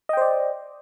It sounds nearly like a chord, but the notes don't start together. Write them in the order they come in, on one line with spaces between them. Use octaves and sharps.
D#5 G5 C5 D5